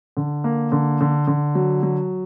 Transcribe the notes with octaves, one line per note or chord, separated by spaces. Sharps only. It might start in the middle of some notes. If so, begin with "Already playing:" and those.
D3
A#3
D3
D3
D3
F#3
F#3